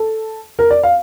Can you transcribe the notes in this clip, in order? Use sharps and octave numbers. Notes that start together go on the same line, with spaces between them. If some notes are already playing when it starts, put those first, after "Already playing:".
Already playing: A4
A#4
D5
F5